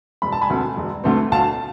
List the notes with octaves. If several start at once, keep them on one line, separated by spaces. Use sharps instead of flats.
E1 B5
A5
G#5 B5
D2 D3 A3 C4
E1
D2 D3 A3 C4
D2 F5 A5